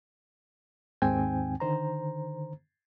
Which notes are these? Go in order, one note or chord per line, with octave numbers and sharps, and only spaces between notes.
D#2 G#2 D#3 C4 G5 G#5
D3 D#3 C5 A#5